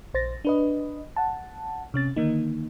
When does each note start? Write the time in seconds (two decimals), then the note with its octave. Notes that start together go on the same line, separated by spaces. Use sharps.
0.14 A#1 C5 A6 A#6
0.45 D4 B4 D#5
1.16 F#5 A5
1.94 C3 C#4 A6
2.16 D3 D#3 A#3 D#4